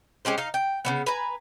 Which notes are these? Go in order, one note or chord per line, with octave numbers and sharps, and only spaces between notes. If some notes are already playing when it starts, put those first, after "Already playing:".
G#3 C#4 G4 C5
D#4 F5
G5
C#3 F#3 B3
B4 G#5 A#5